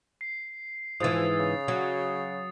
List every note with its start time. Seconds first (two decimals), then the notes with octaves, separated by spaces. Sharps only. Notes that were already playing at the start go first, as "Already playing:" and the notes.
0.21 C7
1.00 G#2 E3 F3 D#6 A6
1.39 C#3
1.68 F#3